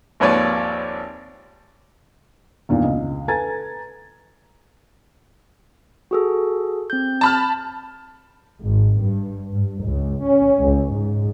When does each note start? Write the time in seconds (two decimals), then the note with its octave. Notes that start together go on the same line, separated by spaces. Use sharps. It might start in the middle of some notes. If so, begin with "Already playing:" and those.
0.20 G#1 D#2 F3 B4 C#5 D5
2.69 E2 G2 A#2 D#3 B3
2.83 C#2 D#5
3.28 A4 B4 G#5 A#5 G#6 A6
6.11 F#4 G#4 A4
6.90 C4 G6
7.21 A5 B5 F6
8.62 G#1
8.99 G2
9.54 G2
9.85 C#2
10.24 C#4
10.60 C#2
10.93 G#2